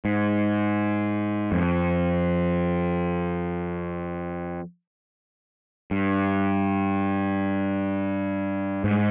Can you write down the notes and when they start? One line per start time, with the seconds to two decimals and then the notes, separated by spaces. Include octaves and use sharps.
0.05 G#2
1.52 F2
5.91 G2
8.84 G#2